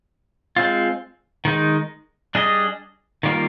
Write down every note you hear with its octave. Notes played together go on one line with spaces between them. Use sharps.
G#3 C4 F4
D#3 G#3 D#4
G3 D4 G#4 D#5
D#3 G3 A#3 F4 A#4